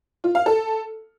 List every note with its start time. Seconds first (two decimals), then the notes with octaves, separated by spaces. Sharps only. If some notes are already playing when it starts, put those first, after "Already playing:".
0.24 F4
0.35 F5
0.46 A4